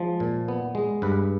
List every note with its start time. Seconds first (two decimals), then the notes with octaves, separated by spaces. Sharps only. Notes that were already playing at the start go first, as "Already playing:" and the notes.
Already playing: F3 G#3
0.20 A#2
0.48 B3
0.75 G#3
1.02 G2 B4